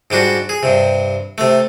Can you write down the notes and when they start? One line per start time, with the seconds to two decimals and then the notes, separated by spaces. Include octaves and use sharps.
0.10 G#2 G3 D4 F#4
0.49 G#4
0.63 G2 C3
1.38 C3 A3